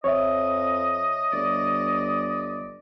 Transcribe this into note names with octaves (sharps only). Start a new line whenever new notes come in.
F2 C#5 D#5 E5
G1 D5